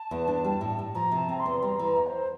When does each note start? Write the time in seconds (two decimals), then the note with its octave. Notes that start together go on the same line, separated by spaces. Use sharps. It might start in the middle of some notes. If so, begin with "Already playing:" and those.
Already playing: A5
0.11 E2
0.28 D4
0.45 G3
0.61 A2
0.79 A2
0.95 F3 A#5
1.12 C3
1.17 A5
1.29 C4 A#5
1.40 C6
1.46 E2
1.62 G3 A#5
1.79 E3
1.85 A#5
1.96 E2
2.07 C5